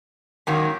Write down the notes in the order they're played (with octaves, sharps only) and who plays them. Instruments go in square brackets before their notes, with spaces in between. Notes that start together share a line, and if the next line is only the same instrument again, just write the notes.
[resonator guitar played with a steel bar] G#2 D#3 F#3 A#3 C#4